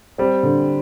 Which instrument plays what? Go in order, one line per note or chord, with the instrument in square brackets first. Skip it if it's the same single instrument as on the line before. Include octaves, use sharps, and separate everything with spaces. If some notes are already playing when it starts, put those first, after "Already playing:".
[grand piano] G3 [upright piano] C4
[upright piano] D3